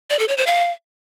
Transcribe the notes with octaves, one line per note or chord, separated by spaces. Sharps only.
D5
A4
C#5
C5
F5